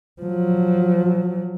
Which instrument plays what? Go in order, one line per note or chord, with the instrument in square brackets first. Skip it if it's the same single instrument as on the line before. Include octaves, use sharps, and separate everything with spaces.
[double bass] F3 F#3